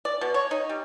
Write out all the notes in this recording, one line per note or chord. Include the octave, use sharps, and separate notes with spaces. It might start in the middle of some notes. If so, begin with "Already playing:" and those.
D5
B2
C#5
D#4
G3